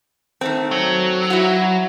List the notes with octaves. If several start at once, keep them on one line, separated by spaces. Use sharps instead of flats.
D#3 A3 C4
F#3
E4 F#4